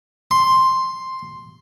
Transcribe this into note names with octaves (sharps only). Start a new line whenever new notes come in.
C6